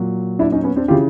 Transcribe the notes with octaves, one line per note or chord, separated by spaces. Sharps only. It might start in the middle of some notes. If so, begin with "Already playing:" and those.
Already playing: A#2 F#3
D4 E4
C#4 D#4
B3 C#4
C4 D4
C#3 E3 F4 G4